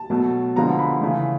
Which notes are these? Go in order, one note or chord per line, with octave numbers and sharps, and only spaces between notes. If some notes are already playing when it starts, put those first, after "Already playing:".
Already playing: A5
B2 F#3 A3
D3 F3 G#3 B3 A#5
B5
C#3 E3 A3